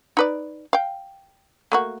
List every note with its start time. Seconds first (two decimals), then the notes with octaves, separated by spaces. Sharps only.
0.17 D#4 B4 D5
0.73 F5 G5
1.72 A3 A#3 F#4